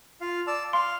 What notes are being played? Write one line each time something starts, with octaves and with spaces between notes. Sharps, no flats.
F4 F5
D5 A5 E6
F5 C6